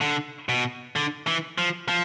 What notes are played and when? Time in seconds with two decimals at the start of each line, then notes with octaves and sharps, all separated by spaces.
0.01 D3
0.49 B2
0.96 D3
1.27 E3
1.58 F3
1.88 F3